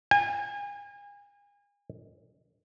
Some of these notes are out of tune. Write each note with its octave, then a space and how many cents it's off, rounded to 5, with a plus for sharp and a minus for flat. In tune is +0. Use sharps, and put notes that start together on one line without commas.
G#5 -35